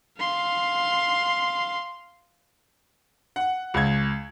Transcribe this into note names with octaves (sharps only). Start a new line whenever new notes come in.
F5 C6
F#5
C#2 G#6